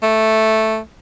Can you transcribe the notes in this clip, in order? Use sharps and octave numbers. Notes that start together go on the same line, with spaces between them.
A3